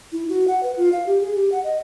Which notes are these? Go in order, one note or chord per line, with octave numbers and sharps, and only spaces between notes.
E4
F#4
F#5
B4
F4
F5
G4
G#4
G4
F#5
D#5